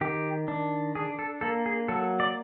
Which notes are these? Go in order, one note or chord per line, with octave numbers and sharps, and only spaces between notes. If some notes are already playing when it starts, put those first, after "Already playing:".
D#3 G4
D4
D4 G#4
A4
A#3 A4
G#4
F#3 A4
D5